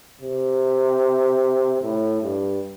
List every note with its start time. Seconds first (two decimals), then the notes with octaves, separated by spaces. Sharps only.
0.21 C3
1.81 A2
2.21 G2